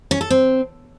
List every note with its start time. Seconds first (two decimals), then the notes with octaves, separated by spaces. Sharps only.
0.11 C#4
0.21 A4
0.30 C4